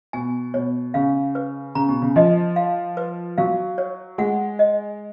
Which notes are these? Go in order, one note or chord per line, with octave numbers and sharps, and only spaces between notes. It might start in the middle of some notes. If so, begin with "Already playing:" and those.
B2 G#5
B2 C#5
C#3 F5
B4
C#3 A#5
B2
C#3
F3 D#5
F5
B4
F#3 F5
C#5
G#3 F#5
D#5